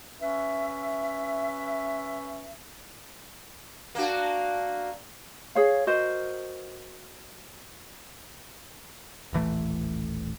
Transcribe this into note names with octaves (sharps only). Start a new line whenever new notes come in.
C#4 B4 E5
A#3 D4 F#4
G#4 C#5 F5
F#4 A#4 C5 D#5
D#1 A1 E3 A3